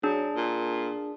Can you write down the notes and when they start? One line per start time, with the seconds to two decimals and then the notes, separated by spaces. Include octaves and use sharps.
0.03 F#3 D4 G#4
0.36 A#2